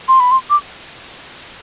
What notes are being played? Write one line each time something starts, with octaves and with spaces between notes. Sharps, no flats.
C6
B5
C6
D6